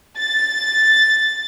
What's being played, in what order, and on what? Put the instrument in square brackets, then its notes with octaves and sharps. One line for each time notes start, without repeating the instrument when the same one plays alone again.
[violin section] A6